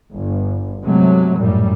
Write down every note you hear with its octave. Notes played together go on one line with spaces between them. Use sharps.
G1
C3 F#3 G#3 A3
A#1 F#2 A2 G3